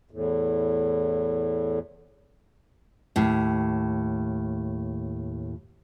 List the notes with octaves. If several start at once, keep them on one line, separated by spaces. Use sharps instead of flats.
E2 A2
D#2 A2